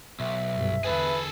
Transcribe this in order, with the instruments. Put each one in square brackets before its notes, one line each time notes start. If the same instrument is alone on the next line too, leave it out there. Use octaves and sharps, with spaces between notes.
[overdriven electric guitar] B1 [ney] E5
[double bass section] G1 C2 G2
[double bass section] E2 D3 [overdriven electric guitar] G#4 A4 [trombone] B4